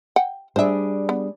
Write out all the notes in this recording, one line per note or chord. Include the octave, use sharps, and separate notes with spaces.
F#5 G5
G3 D4 G#4 C5 E5
B3